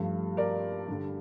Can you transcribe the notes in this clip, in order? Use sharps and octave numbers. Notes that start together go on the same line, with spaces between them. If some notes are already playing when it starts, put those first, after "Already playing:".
Already playing: G2 F3 A3
A#4 D5
G2 D3 G3